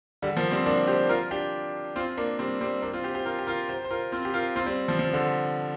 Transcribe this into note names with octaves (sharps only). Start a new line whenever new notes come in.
D3 G3
F3 A#3
G3 C4
A#3 D4
G4 C5
F4 A#4
D4 G4
C4 F4
A#3 D4
G3 C4
G3 C4
A#3 D4
C4 F4
G4 C5
G4 C5
F4 A#4
G4
F4 A#4
G4 C5
C5
F4 A#4
C4 F4
G4
F4 A#4
C4 F4
G3 C4
F3
F3
D3